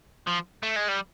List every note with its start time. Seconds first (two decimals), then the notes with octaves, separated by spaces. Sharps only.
0.27 F3
0.63 A3
0.76 G#3
0.89 G3